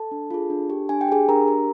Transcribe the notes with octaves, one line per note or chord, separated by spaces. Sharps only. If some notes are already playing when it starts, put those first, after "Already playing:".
Already playing: A4 A5
D4
F4 G#4
D4
G4
D4 G#5
G5
G4 G#4 G#5
D4 A#4 A#5
G4